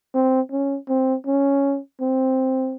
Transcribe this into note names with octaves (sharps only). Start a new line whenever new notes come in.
C4
C#4
C4
C#4
C4